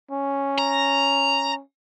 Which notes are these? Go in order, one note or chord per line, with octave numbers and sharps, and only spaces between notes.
C#4
A#5